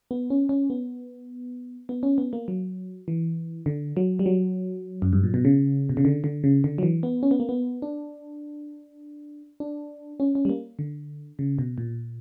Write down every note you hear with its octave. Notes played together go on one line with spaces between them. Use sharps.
B3
C#4
C#4
B3
B3
C#4
B3
A#3
F#3
E3
D3
F#3
G3
F#3
F#2
G2
A#2
B2
C#3
B2
C#3
D3
D3
C#3
D3
F#3
E3
B3
C#4
B3
A#3
B3
D4
D4
C#4
C#4
G3
A#3
D3
C#3
B2
A#2